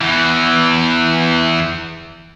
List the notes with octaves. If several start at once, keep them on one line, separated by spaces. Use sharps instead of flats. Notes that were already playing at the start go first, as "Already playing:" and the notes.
E2 E3